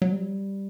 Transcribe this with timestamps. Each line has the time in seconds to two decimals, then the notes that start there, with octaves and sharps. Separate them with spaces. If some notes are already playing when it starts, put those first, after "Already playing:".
0.02 F#3
0.12 G3